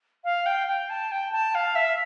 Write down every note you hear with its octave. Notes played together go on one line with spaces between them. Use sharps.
F5
G5
G5
A5
G5
A5
F5
E5